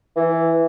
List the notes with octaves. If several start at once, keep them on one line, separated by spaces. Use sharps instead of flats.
E3